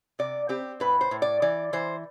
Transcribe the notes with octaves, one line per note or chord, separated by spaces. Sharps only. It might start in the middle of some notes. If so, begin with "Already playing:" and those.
C3 D5
C4 G4
A2 B4
C5
A2
D5
E3 D5
E3 C5